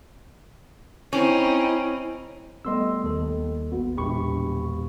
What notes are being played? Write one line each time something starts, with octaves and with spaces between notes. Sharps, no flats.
C4 C#4 D#4 E4
G3 A3 B3 D#5 C6 E6
D#2 A4
G#1 B3 F#4
E1 A#1 G4 B5 C#6